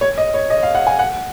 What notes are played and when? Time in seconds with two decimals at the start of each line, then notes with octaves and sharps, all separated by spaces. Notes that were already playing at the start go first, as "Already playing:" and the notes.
0.01 C#5
0.18 D#5
0.34 C#5
0.50 D#5
0.63 F5
0.75 F#5
0.87 G#5
0.99 F#5